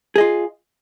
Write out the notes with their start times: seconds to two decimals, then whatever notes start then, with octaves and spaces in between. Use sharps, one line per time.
0.16 G#4
0.18 D#5
0.21 F4